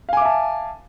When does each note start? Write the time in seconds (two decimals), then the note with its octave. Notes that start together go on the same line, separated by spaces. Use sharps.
0.09 F5
0.13 G#5
0.17 D6
0.21 E5
0.25 A5